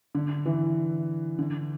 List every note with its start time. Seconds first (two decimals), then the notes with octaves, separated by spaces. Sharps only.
0.15 D3
0.46 E3
1.39 D3